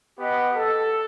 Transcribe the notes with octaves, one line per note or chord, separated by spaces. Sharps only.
B3 G4 D#5 F#5
A4